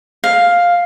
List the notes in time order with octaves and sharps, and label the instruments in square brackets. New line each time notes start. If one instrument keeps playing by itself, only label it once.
[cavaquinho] F5